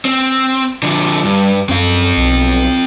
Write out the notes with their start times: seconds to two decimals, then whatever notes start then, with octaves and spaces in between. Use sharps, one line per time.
0.05 C4
0.83 D3 F3
1.24 G2 G3
1.69 F#2 C4 F5
2.17 B1